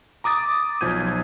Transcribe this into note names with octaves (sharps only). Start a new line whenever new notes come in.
A#5 D6 D#6 A6
B1 F3 G6 G#6 D#7